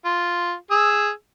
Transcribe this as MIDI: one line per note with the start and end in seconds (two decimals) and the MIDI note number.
0.05 0.54 65
0.71 1.10 68
0.71 1.10 88